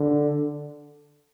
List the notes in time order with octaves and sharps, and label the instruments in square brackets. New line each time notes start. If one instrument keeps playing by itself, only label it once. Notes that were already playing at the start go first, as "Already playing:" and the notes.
Already playing: [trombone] D3